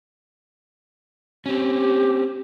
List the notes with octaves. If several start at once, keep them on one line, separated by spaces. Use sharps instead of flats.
C4 C#4 G4